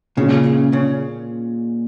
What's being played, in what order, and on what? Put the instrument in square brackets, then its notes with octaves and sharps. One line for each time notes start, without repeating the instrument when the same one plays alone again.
[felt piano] A#2 G#3 C#4 F4 [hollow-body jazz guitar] C#3
[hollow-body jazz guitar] C#3